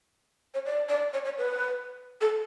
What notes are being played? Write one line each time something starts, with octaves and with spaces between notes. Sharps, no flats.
C#5
D5
D5
C#5
C#5
B4
A4